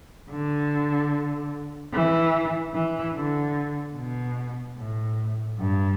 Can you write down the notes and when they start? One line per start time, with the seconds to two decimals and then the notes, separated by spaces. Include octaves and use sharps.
0.30 D3
1.93 E3
2.74 E3
3.14 D3
3.94 B2
4.76 A2
5.58 G2